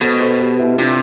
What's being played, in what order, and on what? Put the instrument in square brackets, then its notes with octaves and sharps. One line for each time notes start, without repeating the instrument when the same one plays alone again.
[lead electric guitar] B2 [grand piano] A4 C5
[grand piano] A4 C5
G4 B4
E4 G4
[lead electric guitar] C3 [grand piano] D4 F4